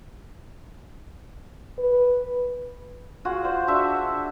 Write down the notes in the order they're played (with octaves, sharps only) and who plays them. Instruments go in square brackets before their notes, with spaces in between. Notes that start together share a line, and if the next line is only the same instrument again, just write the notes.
[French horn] B4
[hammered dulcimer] F4 F#4 G#4 F#5
C5 D5
D4 F#4 E5